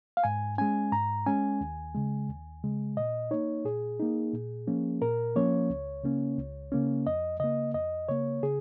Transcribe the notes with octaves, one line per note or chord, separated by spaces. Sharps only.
F5
G#2 G#5
G#3 C#4 G#5
G#2 A#5
G#3 C#4 G#5
D#2
C#3 G#3
D#2
C#3 G#3
A#2 D#5
A#3 D#4 C#5
A#2 G#4
A#3 D#4
A#2
F3 A#3 C#4
A#2 A#4
F3 A#3 C#4 C#5
C#2
C#3 A#3 C#4
C#2
C#3 A#3 C#4
F2 D#5
C#3 A#3 D#5
F2 D#5
C#3 A#3 C#5
C#3 G#4